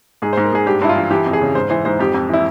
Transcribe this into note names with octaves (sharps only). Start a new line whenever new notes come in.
G#2 G#4
G#2 C5
A#4
G#2 G#4
G2 G4
G2 E4
F4
E3
E3 G4
F2
G#4
C#3
G#2 C5
E3 C5
G#2 C5
F2 G4
F2
E3 E4